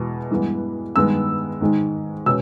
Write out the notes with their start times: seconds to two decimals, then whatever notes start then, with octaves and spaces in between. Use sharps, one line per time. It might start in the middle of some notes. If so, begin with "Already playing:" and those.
Already playing: E2 B2 G#3
0.31 G2 E3 G#3 B3
0.96 G2 D#3 G#3 B3 E6
1.61 G#2 D#3 G#3
2.26 B2 G#3 C#4 E6